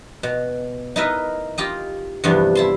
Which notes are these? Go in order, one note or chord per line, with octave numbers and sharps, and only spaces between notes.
B2
D#4 E4 A#4 B4 D#5 E5
F4 G4 D#5
E2 G2 C3 F3 B3 D4
E4 A5 C6